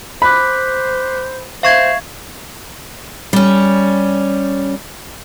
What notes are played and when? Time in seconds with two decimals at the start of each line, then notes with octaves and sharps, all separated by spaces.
0.22 C5 B5 D6 F#6 B6
1.63 C5 E5 F5 C#6 G#6 C7 E7
3.33 G3 C#4